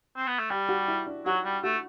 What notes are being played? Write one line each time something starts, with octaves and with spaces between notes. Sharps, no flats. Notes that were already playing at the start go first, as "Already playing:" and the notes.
C4
B3
A3
G3 G4
F#4
E4
D4
F#3 F#4
G3
A3 F#4